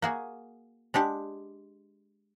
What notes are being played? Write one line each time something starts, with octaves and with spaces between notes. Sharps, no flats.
A#3 F#4 G#4
G#3 D4 G4 F#5